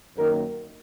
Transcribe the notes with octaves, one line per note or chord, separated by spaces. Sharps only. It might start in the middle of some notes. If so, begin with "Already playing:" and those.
F#2 D#3 A#3 A#4